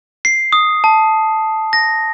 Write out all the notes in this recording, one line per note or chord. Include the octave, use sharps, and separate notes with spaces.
C7
D#6
A5
A#6